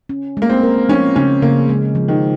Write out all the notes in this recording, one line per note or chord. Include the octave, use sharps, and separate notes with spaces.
C#4
G#3 A#3
C4
A#4
F3 C#4
C#3 C#4
C#3 A#3
G#3
F3
D#3